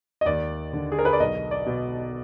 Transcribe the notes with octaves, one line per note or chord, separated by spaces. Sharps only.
D#5
D#2 D5
D3
G#4
A#4
B4
D5
B1 D#5
D5
B2